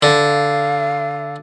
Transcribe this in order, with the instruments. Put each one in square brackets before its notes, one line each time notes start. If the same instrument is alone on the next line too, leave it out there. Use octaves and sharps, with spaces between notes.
[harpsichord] D3 [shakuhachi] F5